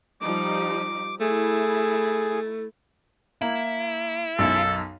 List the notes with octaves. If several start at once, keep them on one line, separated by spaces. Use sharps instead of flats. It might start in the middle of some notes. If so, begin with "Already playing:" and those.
F3 G3 D#4 D6
A3 E4 G#4
A#3 E4
B1 F#2 A4